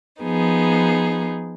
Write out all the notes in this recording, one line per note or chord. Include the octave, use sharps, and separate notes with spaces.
F3 B3 D#4 G#4